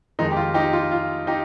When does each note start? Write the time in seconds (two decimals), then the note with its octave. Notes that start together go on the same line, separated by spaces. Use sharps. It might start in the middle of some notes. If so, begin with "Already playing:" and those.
0.19 F2 D#3 G#3 D#4
0.31 G4
0.36 F4
0.54 D#4 G4
0.73 F4
0.91 F4
1.27 D#4 G4